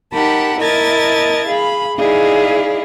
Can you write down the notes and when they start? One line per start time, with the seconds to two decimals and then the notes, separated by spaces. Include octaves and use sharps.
0.12 D#4 G4 A#4 F#5 A5 B5
0.59 E4 A#4 D#5 A5 G#6 A6
1.47 G#4 F5 B5
1.97 D#4 E4 G#4 D5 D#5 F5